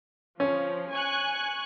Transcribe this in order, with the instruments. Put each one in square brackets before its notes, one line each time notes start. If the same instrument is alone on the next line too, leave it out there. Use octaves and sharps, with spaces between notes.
[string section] F3 [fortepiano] C#4
[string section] G#5 C#6 F#6